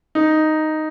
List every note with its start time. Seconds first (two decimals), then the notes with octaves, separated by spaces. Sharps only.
0.15 D#4